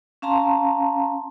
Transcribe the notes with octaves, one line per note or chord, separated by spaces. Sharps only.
C#4 F5 A5 A#5 C6